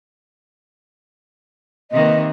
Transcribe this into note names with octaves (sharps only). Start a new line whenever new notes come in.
C3 D#3 A#3 B4 D#5